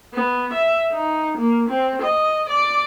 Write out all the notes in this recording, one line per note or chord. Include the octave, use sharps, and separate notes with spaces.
B3
E5
D#4
A#3
C4
D#5
D5